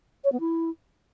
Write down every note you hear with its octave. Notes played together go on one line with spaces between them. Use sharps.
C#5
B3
E4